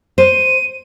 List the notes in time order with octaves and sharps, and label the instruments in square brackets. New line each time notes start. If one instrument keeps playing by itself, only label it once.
[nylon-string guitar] C5 [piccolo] D#7